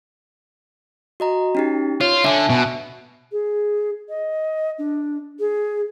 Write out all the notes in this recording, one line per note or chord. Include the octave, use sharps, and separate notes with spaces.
F#4 D#5 A#5
C#4 D#4 G4
F4 C#5
D3 E5 G#5 A5
B2
G#4
D#5
D4
G#4